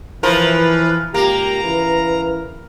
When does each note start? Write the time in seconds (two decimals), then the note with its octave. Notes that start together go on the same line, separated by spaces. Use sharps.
0.23 E3 F3 A#4 B4
1.14 C#2 A#2 A#3 G4 A#5
1.64 C#3 E3 B4